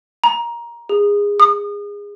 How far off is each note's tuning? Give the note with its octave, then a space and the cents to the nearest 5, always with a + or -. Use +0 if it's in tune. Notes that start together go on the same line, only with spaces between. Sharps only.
A#5 +15
G#4 -25
D#6 -35